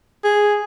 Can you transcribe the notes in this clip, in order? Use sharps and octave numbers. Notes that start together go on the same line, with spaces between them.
G#4